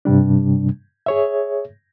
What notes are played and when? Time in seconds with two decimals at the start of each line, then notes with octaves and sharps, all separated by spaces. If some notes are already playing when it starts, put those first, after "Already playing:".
0.05 G2 C3 G3 D4
1.06 G#4 C#5 E5